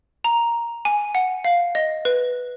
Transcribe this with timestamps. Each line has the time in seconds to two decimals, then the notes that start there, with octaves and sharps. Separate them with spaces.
0.24 A#5
0.85 G#5
1.15 F#5
1.45 F5
1.75 D#5
2.05 B4